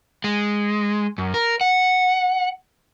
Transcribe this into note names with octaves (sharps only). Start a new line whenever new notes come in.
G#3
F#2
A#4
F#5